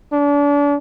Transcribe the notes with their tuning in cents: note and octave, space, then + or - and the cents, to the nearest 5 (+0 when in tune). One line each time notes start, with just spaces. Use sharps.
D4 -35